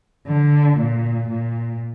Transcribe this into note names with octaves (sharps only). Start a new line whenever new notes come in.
D3
A#2
A#2